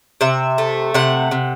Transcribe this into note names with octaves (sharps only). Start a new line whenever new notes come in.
C3 E5
A3
C3 F#5
C3